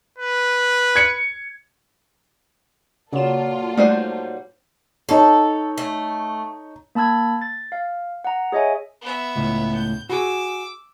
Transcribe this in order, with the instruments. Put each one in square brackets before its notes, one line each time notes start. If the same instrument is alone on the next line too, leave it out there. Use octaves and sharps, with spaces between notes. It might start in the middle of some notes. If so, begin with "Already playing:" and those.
[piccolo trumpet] B4
[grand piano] G#6 C#7
[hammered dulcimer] A#2 F#3 [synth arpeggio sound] C#3 E7 [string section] A#3 F4 A4
[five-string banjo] G3 D#4 C5 [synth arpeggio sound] A3 D5 F#5
[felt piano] D#4 C#5 [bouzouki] A4
[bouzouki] A3
[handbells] A#3 A5 B5 E6 G#6
A6
F5
F#5 A#5
G#4 C#5 D#5 E5 G#5
[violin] B3 E5
[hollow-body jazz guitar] C#2 A2
[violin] G6
[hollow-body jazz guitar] F#4 G#4 [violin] D6 E6